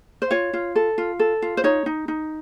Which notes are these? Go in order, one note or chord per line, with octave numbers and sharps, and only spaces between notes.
C5
F4 C#5
F4
A4
F4
A4
F4
C5
D#4 C#5
D#4
D#4